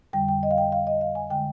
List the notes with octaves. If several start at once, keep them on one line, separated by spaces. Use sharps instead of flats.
F2 D3 G3 G5
G5
D#5
F5
G5
F5
D#5
F5
G#5
D3 G#3 G5